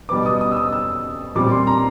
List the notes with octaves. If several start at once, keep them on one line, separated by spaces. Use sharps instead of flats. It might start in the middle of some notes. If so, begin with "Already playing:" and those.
B2 G3 B3 D6
D#6
D#6
E6
D#6
E6
A#2 G3 C4 D6
C6
A#5